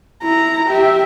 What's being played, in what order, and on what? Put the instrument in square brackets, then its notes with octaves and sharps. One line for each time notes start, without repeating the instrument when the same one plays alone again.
[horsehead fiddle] E4 [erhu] A#5
[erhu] G4 [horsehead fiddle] E5